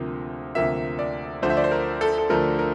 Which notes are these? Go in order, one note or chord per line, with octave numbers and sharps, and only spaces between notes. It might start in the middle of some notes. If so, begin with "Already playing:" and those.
Already playing: D2 C3 F3 A#3
D2 C3 F3 A#3 E5
D5
D2 D3 F3 A3 C5
E5
D5
C5
A#4
A4
A4
D2 D3 F3 A3 A#4
A#4